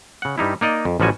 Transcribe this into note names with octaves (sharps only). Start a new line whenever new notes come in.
C#3 F#5
G2 G3 D#4 E4
A#3 D#4 D5 D#5
F2
A1 F3 G3 F#4 G#5